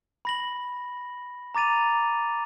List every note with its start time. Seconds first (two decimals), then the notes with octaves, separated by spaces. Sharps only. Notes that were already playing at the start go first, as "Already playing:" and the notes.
0.25 B5 A#6 F#7
1.55 A#5 D6 A6 D#7 F7